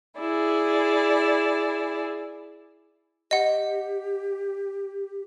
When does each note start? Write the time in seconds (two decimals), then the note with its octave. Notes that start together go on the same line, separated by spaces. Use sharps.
0.18 E4 G#4 D5
3.31 G4 D#5 F#5